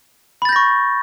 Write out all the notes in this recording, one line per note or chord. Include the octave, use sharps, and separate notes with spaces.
B5 C#6 G6 A6 A#6